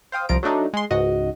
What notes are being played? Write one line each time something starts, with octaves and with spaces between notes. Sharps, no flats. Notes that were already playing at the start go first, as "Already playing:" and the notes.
C5 F5 G5 D#6
C2 F3 F4 A#5 D7
F#3 A3 D4 D#4
G#3 C6
C#2 G#2 F#4 D#5